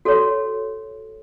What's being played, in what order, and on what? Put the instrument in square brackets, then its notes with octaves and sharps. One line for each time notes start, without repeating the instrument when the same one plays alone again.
[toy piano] F#4 A4 C#5